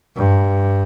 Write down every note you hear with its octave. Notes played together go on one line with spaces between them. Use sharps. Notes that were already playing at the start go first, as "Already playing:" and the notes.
G2